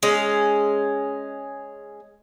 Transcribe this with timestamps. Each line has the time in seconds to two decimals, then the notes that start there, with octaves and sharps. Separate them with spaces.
0.03 G#3 C#4